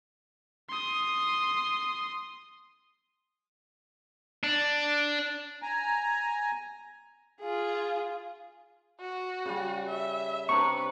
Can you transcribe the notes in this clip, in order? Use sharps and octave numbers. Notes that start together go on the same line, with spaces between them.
C6 D#6
D4
G#5 A#5
F4 G#4
F#4
C#3 G3
E5
C3 D4 B4 A#5 C#6